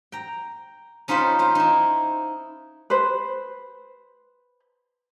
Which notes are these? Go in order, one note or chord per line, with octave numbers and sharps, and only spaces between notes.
G5 A#5
C#4 D#4 F4 C5 B5
F4 C5
D#4 E4
B4 C5